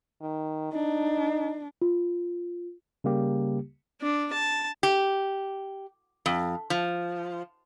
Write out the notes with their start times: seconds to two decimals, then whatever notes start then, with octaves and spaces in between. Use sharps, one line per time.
0.22 D#3
0.73 D4 D#4
1.82 F4
3.04 C#3 G3 A#3 G4
4.01 D4
4.33 A5
4.83 G4
6.26 F2
6.70 F3